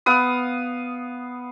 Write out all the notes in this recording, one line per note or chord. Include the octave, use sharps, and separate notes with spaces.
B3 F5 D#6